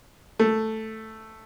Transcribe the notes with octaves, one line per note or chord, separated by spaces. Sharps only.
A3